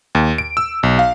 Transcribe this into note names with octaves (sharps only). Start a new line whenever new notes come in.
D#2
D7
E6
B1
F5